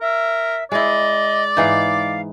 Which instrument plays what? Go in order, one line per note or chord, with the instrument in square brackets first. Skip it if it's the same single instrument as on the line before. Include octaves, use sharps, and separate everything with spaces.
[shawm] A#4 [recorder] E5
[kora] G#3 E4 [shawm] D5 [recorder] D#5
[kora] G#2 E3 D#4 [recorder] F5